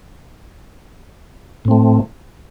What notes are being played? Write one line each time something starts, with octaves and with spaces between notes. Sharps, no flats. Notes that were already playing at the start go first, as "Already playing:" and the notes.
A2 A3 C4